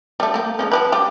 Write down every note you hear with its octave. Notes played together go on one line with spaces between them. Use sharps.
G3 A3
A3 A#3
F3 G#3 C#4
F3 G4 B4
G3 G4